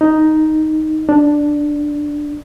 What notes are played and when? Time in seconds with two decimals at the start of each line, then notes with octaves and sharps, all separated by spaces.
0.01 D#4
1.09 D4